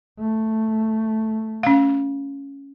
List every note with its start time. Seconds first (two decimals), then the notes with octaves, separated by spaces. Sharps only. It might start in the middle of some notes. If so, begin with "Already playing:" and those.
0.19 A3
1.63 C#4 F5